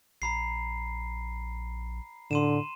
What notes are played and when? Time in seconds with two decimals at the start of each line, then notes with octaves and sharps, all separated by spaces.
0.22 A#1 A#5 B5 C7
2.31 A2 D3 C6 D#7 E7